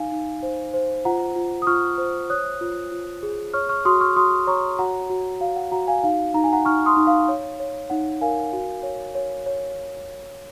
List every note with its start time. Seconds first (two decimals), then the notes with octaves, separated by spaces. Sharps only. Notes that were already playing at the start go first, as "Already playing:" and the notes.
Already playing: D#4 F5 G#5
0.12 D#4
0.43 C5
0.74 C5
1.05 F4 F#5 A#5
1.36 F4
1.62 D#6
1.67 F4 C#6 F6
1.98 C5
2.30 C#5 D#6 F#6
2.61 F4
2.92 F4
3.23 G#4
3.54 C#5 C#6 F6
3.69 C#6 F6
3.85 F#4 C6 D#6
4.01 C#6 F6
4.16 F#4 C6 D#6
4.47 C#5 A#5 C#6
4.79 F#4 F#5 A#5
5.10 F#4
5.40 F#4 F5
5.56 F#5
5.72 F#4 F#5 A#5
5.88 F5 G#5
6.03 D#4 F5
6.34 D#4 A#5
6.44 G#5
6.53 F#5 A#5
6.65 D#4 C#6 F6
6.86 C6 D#6
6.97 D#4
7.07 F5
7.28 C#5
7.60 C#5
7.90 D#4 F#5
8.21 A#4 F5 G#5
8.53 F#4
8.83 C#5
9.15 C#5
9.46 C#5